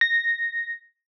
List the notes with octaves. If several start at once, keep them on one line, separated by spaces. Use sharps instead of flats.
A#6